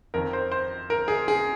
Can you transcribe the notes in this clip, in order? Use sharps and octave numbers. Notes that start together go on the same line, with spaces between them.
F2 D#3 A#4
C5
C5
A#4
G#4
G#4